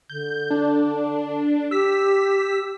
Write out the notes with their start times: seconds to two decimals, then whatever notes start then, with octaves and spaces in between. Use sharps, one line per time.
0.10 D3 G6
0.51 D4
1.71 G4 E6 B6